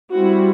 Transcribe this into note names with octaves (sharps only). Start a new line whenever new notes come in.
G3 C4 E4 F#4